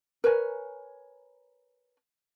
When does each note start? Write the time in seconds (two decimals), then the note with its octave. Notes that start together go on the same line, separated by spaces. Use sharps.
0.24 A#4 B4 C#5 G#5